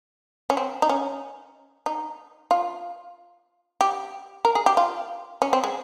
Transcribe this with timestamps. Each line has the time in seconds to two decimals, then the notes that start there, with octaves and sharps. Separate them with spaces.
0.50 C#4
0.57 C4
0.82 D#4
0.89 C#4
1.86 D#4
2.51 F4
3.81 G4
4.45 A#4
4.55 G#4
4.66 G4
4.77 F4
5.42 C#4
5.53 C4
5.64 G#3